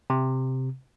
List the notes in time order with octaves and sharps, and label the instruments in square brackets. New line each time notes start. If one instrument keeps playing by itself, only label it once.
[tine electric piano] C3